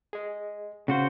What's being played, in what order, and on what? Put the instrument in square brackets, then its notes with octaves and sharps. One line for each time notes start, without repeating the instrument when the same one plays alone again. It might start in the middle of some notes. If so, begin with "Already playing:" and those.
[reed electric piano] G#4 D#5
[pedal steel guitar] C#3 F#4 C5 [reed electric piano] F5 F#5